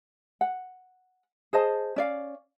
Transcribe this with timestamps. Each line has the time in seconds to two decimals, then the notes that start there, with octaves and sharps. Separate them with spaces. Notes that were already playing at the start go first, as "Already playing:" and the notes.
0.41 F#5
1.53 G#4 C5 D#5 A5
1.96 C#4 D5 F5